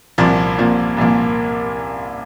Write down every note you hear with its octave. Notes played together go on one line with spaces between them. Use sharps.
C2 A#2 F3 A#3
C2 A#2 F3 A#3
C2 A#2 F3 A#3